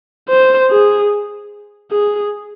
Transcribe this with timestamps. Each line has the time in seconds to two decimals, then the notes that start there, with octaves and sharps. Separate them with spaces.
0.30 C5
0.70 G#4
1.92 G#4